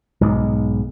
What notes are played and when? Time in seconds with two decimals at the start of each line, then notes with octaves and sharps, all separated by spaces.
0.21 B1 G#2 G#3